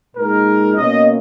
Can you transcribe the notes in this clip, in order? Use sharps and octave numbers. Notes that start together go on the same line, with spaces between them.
A#2 G#3 D#4 A#4
B2 A#3 C#4 D#5